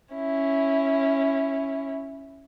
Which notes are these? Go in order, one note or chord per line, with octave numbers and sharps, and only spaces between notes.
C#4 E4